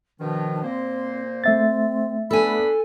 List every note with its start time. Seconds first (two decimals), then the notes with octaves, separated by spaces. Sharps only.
0.20 B2 D#3 F3 D4
0.63 A#2 A#3 C4 C5
1.44 A3 C4 E5 A6
2.31 B3 D4 A4 G#5 B5